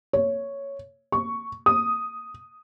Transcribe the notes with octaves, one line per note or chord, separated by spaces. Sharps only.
C#5
C#6
D#6